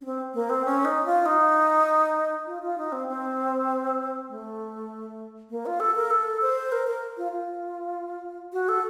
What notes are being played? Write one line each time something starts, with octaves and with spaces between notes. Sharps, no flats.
C#4
C4
A#3
C4
C#4
D#4
F4
D#4
F4
F4
D#4
C4
C4
A3
A#3
F4
A4
A#4
A4
C5
A#4
A#4
F4
F4
F#4
A4